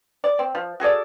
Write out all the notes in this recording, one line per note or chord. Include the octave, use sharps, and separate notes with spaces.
D5
C4
F3
F#4 G#4 A4 D5